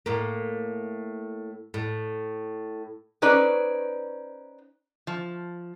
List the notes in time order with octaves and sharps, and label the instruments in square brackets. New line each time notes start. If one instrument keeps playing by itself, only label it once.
[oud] A2 A#3
A2
[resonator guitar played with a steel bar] C#4 D#4 B4 C5 D5
F3